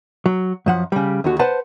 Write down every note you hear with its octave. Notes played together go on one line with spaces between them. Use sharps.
F#3
F#2 F3 F#5
C#3 G3
D#2 D3 F#4
B4 C5 F#5 A5